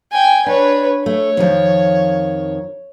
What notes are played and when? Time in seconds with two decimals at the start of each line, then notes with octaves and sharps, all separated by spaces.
0.12 G5 G#5
0.46 D4 B4 C#5
1.06 A3 C#5
1.37 F2 D#3 F3